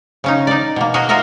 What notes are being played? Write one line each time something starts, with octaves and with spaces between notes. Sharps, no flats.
C#3 C#4 D#4
D#4 D5
B2 A#3
F#4 G#4 A#4 D#5
F4 F#4 A#4 D#5 E5